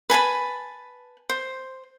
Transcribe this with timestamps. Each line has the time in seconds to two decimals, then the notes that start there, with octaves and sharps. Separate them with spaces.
0.10 B4 G#5 A5 B5
1.29 C5